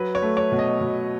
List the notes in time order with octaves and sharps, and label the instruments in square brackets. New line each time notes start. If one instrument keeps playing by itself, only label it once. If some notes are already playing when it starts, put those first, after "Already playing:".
Already playing: [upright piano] F#3 B4
C#5
A3
C#5
B2
D#5
B2